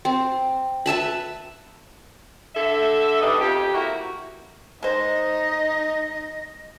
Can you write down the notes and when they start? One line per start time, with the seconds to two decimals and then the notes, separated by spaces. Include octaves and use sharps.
0.05 C4
0.86 B4 E5 A5 B5
2.55 D3 A4 E5
3.21 G3 B3 D4 D#4 D#5
3.40 F2 G4
3.73 A#3 E4 F#4
4.83 G#3 D#4 C5 D#5